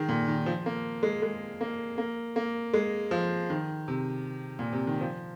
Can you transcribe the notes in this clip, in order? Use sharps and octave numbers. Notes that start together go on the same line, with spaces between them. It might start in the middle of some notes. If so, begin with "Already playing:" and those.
Already playing: D#3 G#3
A#2
D#3
F3
A#3
G#3
G#3
A#3
A#3
A#3
G#3
F3
D#3
C3
A#2
C3
D#3
F3